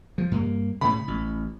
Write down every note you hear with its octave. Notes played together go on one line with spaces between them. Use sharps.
F3
G2 A#3
A2 C#3 B5
A1